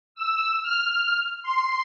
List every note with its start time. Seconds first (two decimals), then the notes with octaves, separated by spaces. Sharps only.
0.15 E6
0.62 F6
1.43 C6